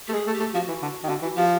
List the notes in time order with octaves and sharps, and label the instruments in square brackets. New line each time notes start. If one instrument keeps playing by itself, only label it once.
[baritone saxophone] A3 [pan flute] G4
[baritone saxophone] G#3 [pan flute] G#4
[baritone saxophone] A3
[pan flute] G4
[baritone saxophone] A3
[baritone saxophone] F3 [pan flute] F#4
[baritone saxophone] E3
D3
D#3
D3
E3
[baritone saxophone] F3 [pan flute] G4